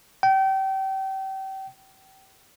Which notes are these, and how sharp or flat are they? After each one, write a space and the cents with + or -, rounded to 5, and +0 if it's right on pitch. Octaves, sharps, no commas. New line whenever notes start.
G5 -30